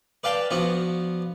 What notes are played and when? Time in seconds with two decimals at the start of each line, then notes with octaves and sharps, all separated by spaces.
0.24 B4 D5 F5 G5 A5
0.51 F3 B3 D4 F#4